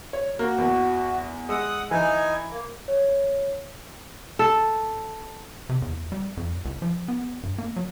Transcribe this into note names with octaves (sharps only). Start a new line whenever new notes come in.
C#5
A#3 F#4
E2
G#3 F#5 D#6 E6
E3 D#4 G#5
A#3
C#5
A4
C3
E2
G3
F2
C#2
F3
B3
G2
A#3
F#3